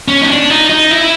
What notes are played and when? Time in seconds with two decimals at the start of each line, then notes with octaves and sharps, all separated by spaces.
0.08 C#4
0.21 D#4
0.28 D4
0.50 D#4
0.70 D#4
0.91 E4